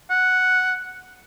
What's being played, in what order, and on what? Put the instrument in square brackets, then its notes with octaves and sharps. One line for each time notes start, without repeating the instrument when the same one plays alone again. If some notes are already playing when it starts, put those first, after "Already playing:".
[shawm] F#5